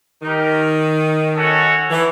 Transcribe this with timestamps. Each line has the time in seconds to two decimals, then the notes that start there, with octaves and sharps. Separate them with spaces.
0.23 D#3 D#4 G4 A#4
1.35 C#4 F#4 A4 C#5 F#5
1.91 E3